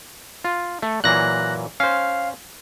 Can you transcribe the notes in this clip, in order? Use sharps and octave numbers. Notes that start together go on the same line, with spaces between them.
F4
A3
A#2 E3 F#3 F#6 A#6
C#4 C5 F5